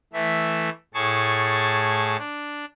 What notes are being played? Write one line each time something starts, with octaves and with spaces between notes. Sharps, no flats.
E3 A3 E5
A2 G#4 A5 C#6
D4